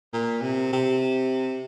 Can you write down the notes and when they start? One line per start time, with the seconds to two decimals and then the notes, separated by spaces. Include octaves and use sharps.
0.13 A#2
0.42 C3
0.73 C3